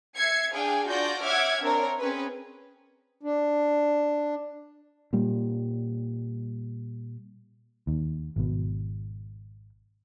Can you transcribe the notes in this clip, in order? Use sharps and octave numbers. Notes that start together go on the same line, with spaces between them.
E5 G#6 C7 C#7
D4 G#4 F5 G5
D4 F4 F#4 D5 G6 A#6
C#5 E5 F#5 D6 F6 G#6
C4 D4 A#4 C#5
C4 C#4 G#4 B4
D4
A#2 G3
D#2
G#1 B2